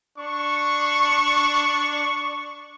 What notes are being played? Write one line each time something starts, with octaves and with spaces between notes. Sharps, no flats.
D4 C#6